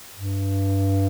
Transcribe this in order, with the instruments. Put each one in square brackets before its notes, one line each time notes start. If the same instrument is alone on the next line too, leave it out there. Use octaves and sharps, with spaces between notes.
[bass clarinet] G2